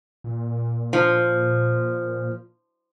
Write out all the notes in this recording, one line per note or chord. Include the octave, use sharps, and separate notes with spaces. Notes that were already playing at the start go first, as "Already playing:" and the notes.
A#2
F3